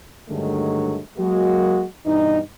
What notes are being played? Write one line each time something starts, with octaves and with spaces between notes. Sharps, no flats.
G2 D3 D#3 F#3 G#3 A3
F#3 G#3 A#3 F#4
G2 B2 E3 G3 D#4